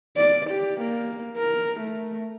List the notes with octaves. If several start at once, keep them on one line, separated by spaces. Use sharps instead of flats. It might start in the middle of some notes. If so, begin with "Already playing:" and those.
D5
G4
A#3
A#4
A3